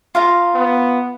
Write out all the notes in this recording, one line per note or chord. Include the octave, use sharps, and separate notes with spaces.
F4 F5 A#5
B3